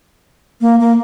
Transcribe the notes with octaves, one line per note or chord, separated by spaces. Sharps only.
A#3
A#3